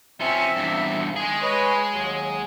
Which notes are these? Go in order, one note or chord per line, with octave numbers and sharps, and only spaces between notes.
F3 C4 C#4 E5
E2 G2
D#3 G#3 G#4
B4 C#5 D#5
D#2 F#3